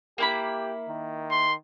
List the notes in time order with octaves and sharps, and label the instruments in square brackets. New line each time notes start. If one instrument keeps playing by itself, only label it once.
[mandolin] A#3 E4 B5 [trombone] G4
[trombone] D#3
[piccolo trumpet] C6